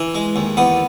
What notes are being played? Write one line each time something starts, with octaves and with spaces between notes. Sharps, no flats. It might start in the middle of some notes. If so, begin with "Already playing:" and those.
Already playing: E3
G#3
D#2
E2 B3 B4